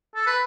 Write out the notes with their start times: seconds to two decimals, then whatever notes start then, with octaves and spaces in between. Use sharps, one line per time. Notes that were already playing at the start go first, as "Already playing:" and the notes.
0.15 A4
0.27 B4